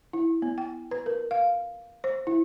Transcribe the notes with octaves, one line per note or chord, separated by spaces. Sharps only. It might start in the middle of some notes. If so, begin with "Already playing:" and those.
E4
B3
G5
B4
A#4
F5
C5
E4